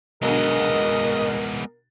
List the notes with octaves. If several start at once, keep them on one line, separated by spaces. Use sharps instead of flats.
B1 B2 D3 G#3 B3 A#4 D#5